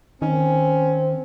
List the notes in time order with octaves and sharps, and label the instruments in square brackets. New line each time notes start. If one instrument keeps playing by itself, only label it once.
[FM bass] D#3 [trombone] C4 [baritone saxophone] C#4